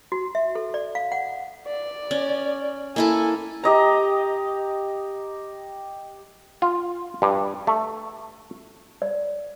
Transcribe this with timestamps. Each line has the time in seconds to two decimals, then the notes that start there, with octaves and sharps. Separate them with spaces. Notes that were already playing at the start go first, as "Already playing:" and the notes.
0.12 F#4
0.35 E5
0.55 A4
0.74 D5
0.95 F5
1.12 F#5
1.67 D5
2.11 C#4
2.96 A#3 E4 A4 G#5
3.64 G4 D#5 A#5
6.62 F4
7.22 G2
7.67 A3
9.02 D5